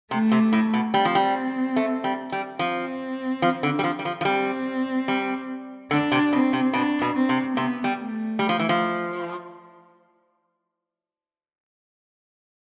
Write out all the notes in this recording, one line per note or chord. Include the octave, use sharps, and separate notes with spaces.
C3 A3
C3
A2
B2
G3 C4
F3
G3
A3
G3
G3
F3 C4
F3
D3
G3
F3
G3
F3
F3
G3 C4
G3
D3 D4
C3
B2 C4
C3
B2 D4
B2
C4
C3
C3 B3
G3
A3
G3
F3
E3
F3